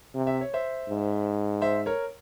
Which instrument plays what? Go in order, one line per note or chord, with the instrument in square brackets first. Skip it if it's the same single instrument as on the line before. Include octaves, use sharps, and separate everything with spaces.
[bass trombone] C3
[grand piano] E5
C#5
C5 E5
[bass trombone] G#2
[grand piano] C5 E5
A#4 C#5